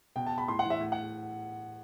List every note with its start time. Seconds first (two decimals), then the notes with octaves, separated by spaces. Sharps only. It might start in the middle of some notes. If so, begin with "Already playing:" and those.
0.16 B2 G5
0.27 A5
0.38 B5
0.48 A2 C6
0.59 F#5
0.65 E3
0.70 E5
0.80 A2
0.92 F#5